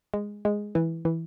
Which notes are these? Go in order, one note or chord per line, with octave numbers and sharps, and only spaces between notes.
G#3
G#3
E3
E3